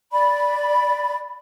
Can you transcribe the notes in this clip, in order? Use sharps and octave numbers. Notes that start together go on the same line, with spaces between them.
D5 B5